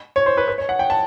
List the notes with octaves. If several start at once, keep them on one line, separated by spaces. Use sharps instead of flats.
C#5
C5
B4
B4
C#5
F#5
G5
A5